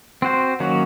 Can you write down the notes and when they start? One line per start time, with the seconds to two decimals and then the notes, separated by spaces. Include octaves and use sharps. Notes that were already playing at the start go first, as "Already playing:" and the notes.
0.22 C4 F#4 C5
0.60 D#3 F#3 A#3 C#4 F#4